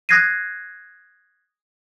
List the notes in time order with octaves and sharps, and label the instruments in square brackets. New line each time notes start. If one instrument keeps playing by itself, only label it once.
[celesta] D#6 F#6 G#6 A#6 C7 D#7